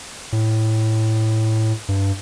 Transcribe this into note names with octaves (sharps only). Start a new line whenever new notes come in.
A2
G2